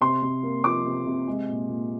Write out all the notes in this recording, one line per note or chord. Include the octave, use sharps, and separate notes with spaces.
C3 C6
C3
A#3
F3 D6
C3
C3
G#3
A#2
A#2